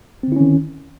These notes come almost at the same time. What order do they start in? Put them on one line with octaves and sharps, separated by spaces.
C4 D3 E4 C#4 D#3